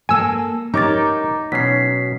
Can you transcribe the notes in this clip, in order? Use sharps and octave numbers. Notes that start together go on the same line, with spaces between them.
A#3 A4 G#5 E6
D#4 G4 A#4 C#5 A#5 D6 A6
B2 F#3 C#4 B6 C7